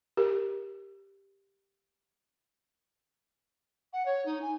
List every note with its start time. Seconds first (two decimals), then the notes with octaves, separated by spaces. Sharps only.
0.17 G4 A#4
3.93 F#5
4.05 C#5
4.25 D#4
4.41 G#5